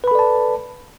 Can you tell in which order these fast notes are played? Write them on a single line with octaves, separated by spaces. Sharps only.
B4 B5 A4 D5 A5